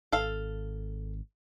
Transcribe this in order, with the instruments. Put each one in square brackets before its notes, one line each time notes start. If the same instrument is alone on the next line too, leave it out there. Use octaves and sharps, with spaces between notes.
[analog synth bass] G#1 [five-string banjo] A4 F5